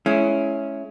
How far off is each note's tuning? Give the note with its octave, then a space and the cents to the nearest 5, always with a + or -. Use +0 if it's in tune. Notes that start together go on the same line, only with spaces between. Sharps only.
G#3 +35 C#4 +0 E4 +10